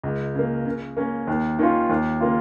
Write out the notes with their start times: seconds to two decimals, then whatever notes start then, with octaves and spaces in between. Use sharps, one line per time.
0.03 C#2
0.35 C#3 A#3
0.66 C#3
0.97 A#3 C#4
1.27 D#2
1.59 D#3 C#4 F4
1.89 D#2
2.21 C#3 A#3 F4